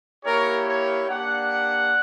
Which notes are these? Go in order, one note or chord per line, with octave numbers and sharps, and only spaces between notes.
A#3 E4 G4 A#4 C#5
A#4 C#5
A#3 D4 G4 D5 F#5